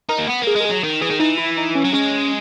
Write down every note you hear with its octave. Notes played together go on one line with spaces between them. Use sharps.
D#4 A#4
A#3
B3
A#3
G#4
G#3 A#4
G#4
F#3
D#3
E3 G#4
D#3
E3 D#4
E4
D#4
C#4
F#3
G#3 C#4